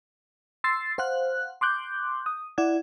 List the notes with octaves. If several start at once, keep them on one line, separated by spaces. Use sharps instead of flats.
C6 E6 A6 C7
C5 F5 F#5 F#6
C6 D6 F#6 G6
D#6
E4 D5 F#5 G#6